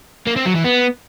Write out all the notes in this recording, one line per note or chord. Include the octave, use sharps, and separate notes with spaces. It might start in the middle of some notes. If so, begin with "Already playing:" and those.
A#3
C4
F#3
E3
B3